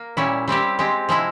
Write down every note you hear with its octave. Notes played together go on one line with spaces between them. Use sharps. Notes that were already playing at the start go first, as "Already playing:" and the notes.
Already playing: A#3
A#2 G3 C#4 E4
G3 C4 E4 G4
G#3 C4 G4
C3 F3 G#3 E4